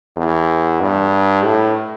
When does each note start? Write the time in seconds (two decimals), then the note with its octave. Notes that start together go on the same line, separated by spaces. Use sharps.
0.16 E2
0.81 G2
1.45 A2